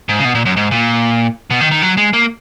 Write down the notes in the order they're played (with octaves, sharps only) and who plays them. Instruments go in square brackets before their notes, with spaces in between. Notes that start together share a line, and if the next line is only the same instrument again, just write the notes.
[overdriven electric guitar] G#2
C#3
B2
A#2
F#2
G#2
A#2
B2
D#3
D#3
F#3
G#3
A#3